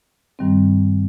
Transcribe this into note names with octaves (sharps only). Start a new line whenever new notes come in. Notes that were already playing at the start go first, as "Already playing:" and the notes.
G2 D#3 G3 C4